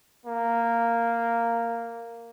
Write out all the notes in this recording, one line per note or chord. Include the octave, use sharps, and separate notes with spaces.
A#3